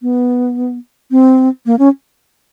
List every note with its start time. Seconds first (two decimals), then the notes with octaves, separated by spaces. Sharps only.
0.02 B3
1.11 C4
1.66 A#3
1.79 C#4